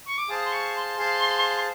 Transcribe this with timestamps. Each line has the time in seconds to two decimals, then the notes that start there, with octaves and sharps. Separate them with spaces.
0.06 C#6
0.17 D6
0.29 G#4 C5 F5 A5 D#6
0.45 C6
0.52 C#6
0.76 C6
0.97 G#4 C5 F5 A5